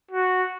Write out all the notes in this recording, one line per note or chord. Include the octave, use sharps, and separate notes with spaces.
F#4